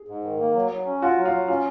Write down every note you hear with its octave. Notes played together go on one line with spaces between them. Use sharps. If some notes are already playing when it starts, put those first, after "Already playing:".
Already playing: G#4
G#2
D#3
A#3
F#3
F#3
C#4
F4 F#4
F#3
F4
F#3
C#4 F4